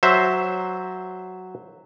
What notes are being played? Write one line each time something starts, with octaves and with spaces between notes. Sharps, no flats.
F#3 C5 E5